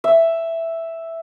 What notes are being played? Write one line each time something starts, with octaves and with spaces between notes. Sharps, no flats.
E5